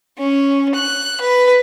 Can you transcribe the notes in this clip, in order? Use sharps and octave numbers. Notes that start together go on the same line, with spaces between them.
C#4
F#6
B4